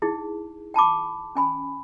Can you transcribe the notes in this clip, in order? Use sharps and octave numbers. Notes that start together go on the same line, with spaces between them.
D#4 E4 G#4
G5 A5 B5 D6
C#4 G#5 B5